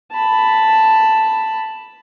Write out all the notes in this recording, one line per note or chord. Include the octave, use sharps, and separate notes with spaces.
A5 B5